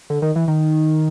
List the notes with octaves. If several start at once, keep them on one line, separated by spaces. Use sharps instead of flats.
D3
D#3
E3
D#3